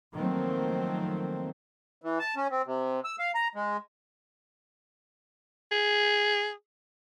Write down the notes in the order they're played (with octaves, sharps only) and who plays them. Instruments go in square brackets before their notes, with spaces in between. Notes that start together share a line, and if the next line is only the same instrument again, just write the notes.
[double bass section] D#3 F3 F#3 A3 A#3 C4
[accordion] E3
A5
C#4
C4
C3
E6
F5
A#5
G#3
[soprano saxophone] G#4